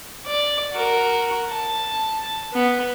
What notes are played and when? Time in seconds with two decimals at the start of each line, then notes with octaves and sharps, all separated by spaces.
0.26 D5
0.72 F#4 A#4
1.50 A5
2.53 B3